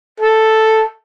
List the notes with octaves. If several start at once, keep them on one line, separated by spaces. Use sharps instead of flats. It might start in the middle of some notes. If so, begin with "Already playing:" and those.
A4